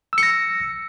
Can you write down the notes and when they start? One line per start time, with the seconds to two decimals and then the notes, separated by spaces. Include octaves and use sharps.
0.13 E6
0.18 C#7
0.23 A#6